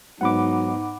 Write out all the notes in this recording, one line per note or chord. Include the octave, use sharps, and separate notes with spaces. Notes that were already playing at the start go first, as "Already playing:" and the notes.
G#2 F#3 B3 D#4 F#5 B5 D6